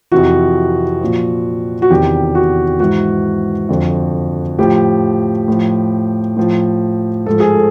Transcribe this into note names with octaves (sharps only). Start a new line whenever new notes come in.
F2 C3 E3 F#4
A#2 F3
F#4
E2 C3 D#3 G4
F#4
G#2 E3 F#4
F2 D3 F3
A2 F3 G4
A2 F3
A2 F3
G#2 F3 A4
G#4
A4